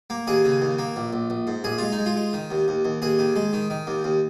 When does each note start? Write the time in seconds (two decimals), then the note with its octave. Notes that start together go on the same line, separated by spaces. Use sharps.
0.10 A#3
0.27 D#2 G#4
0.45 C#3
0.61 D#2
0.78 A#3
0.96 A#1
1.13 A#1
1.30 A#1
1.47 G#2
1.64 A#1 G#4
1.78 G#3 F4
1.92 D#4
1.99 G#3
2.06 F4
2.16 G#3
2.33 D#3
2.51 D#2
2.68 D#2
2.85 D#2
3.02 D#2 G#4
3.19 D#3
3.36 G#3
3.53 D#3
3.70 D#3
3.87 D#2
4.04 D#2